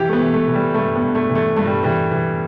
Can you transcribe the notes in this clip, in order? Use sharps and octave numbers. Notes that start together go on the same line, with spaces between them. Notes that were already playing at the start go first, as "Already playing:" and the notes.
Already playing: E3 G4
A3
B3
E3
A3
E3
G3
G2 A3
B3
G2
A3
E3
A3
G2 A3
G3
E3 G3
E3